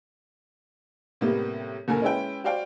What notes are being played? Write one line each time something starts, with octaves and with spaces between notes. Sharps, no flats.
A2 C3 G3 A#3 B3
F#1 A#2 D3 A#4 G#5
G#3 C#4 E4 B4 G5
F#4 C5 D5 F5 G5